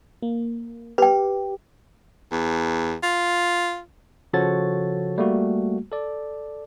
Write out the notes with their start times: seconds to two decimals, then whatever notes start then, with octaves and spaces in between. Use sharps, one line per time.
0.23 A#3
0.98 G4 B4 G5
2.32 E2
3.03 F4
4.33 C#3 F3 F#4 A4 C#5 A6
5.18 G3 A3 A#3 F#4
5.92 A4 D5